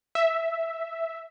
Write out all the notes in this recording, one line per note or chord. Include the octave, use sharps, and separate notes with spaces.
E5